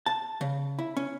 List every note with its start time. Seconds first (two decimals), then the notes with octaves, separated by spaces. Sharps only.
0.06 A5
0.41 C#3
0.79 E4
0.97 C#4